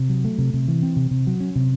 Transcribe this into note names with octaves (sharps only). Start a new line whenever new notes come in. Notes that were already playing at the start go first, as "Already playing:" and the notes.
Already playing: C3
F#3
A3
C3
C3
E3
C4
C3
C3
F#3
C#4
C3